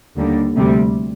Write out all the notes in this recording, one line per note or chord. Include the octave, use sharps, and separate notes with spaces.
D#2 D3 G3 A#3
D2 C3 G3